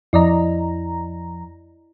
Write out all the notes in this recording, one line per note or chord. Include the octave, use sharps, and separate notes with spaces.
F2 E4 D5 D#5 A#5